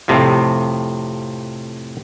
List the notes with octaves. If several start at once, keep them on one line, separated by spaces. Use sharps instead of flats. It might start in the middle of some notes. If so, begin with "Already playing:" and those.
F2 A2 C3 F3